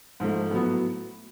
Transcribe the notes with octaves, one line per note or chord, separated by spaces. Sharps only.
G#2 F3 A3
A2 F#3 B3